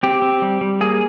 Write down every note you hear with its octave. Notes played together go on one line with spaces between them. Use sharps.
C4 G4
C4
G3
G3
A#3 G#4